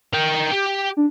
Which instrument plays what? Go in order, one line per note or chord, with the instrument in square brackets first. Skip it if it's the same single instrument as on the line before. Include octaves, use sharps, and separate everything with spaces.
[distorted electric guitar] A#4 G5
G4
[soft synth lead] D4